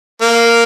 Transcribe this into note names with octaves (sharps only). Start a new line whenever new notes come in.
A#3